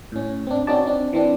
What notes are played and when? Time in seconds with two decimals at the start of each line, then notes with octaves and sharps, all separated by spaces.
0.12 A2 C#4
0.47 C4 D4
0.67 C4 C#4 D#4 F#4 D5 A5
0.86 C4 D4
1.13 E3 C4 D4